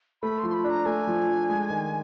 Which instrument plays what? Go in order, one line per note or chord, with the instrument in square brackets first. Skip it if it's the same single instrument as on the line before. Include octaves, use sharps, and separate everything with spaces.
[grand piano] A3 [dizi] B5
[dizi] C6
[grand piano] F3
[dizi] C6
B5
[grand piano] D4
[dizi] A#5
[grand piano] A3 [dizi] G#5
[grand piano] F3
D4
G#3
D#3